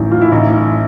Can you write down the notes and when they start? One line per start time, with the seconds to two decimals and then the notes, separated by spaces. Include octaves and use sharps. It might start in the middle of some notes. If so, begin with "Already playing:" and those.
Already playing: A1 D#3 F#3
0.11 F4
0.21 E4
0.32 A1 D#4